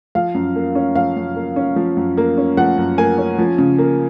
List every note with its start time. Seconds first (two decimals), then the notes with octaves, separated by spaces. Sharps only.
0.15 F3 F5
0.34 F#2
0.56 A#3
0.75 C#4
0.96 F3 F5
1.16 F#2
1.36 A#3
1.56 C#4
1.76 F3
1.97 F#2
2.17 A#3
2.37 C#4
2.57 F3 F#5
2.78 F#2
2.98 A#3 G#5
3.18 C#4
3.38 F3
3.58 C#3
3.79 A#3